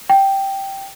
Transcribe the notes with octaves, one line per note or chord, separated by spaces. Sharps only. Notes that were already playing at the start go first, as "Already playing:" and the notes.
G5